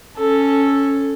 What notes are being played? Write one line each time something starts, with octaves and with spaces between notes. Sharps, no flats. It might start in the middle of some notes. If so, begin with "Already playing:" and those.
C#4 A4